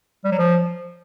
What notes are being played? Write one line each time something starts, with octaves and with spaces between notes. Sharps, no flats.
G3
F#3
F3